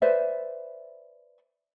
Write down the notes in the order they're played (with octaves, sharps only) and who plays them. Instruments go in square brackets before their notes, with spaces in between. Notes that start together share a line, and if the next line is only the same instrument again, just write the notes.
[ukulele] B4 C5 D5 E5